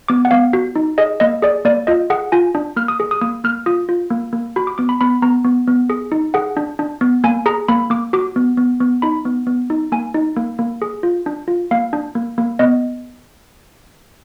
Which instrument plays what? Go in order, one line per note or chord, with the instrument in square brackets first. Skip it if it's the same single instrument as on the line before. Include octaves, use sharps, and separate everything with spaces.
[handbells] B3 D6
F#5
B3 F5
F#4
D#4
G#4 D#5
A#3 D#5
G#4 D5
A#3 D5
F4 D#5
G#4 F#5
F4 G#5
D4
A#3 F6
D#6
G#4
D#6
A#3 D#6
A#3 F6
F4 D#6
F4
A#3
A#3
F#4 B5
D6
B3 D6
B5
B3 B5
B3 A#5
B3
B3
G#4
D#4
G#4 F#5
D4
D4
B3
A#3 G#5
G#4 A#5
A#3 B5
A#3 D6
F#4 D6
B3
B3
B3
D#4 B5
B3
B3
D#4
A#3 G#5
D#4
A#3
A#3
G#4
F4
D4
F4
A#3 F5
D4
A#3
A#3
B3 D#5